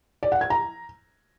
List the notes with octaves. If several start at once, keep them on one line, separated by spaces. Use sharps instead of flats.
D5
F#5
G#6
A#5